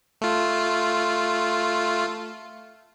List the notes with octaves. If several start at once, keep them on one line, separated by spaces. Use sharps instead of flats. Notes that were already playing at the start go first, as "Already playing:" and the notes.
A3 F4